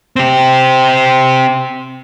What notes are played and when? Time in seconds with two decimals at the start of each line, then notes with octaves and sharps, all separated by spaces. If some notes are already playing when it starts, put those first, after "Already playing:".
0.16 C4 G4